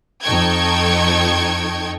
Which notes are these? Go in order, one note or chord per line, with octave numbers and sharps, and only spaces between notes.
F2 D#4 A4 G5 C#6 G#6